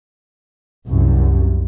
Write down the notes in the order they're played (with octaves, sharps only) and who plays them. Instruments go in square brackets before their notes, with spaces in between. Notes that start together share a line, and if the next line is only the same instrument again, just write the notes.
[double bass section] C2 F#2